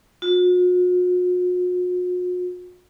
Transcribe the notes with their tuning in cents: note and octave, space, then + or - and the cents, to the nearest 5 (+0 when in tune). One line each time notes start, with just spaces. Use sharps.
F#4 -45